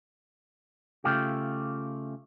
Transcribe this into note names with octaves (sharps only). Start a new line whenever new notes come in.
C#3 A3 F4 G4